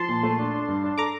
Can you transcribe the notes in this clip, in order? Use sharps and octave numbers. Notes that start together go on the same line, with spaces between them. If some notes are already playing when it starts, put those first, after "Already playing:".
Already playing: F3 A5 C6
A#2
A3
D4
D4
G2
D4
A4 A#5 D6